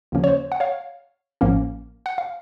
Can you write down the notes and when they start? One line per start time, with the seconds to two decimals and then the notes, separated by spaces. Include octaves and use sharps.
0.12 D#2 C#3 F3 A#3 C#4
0.24 C#5
0.28 C5
0.52 F#5
0.60 C#5 F5
1.41 A1 A2 F3 A#3 C#4
2.06 F#5
2.18 F5